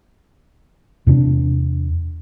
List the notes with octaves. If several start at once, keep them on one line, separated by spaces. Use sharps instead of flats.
E2 C3 B3 D4